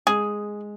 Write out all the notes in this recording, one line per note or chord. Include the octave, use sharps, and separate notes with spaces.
G#3 G#4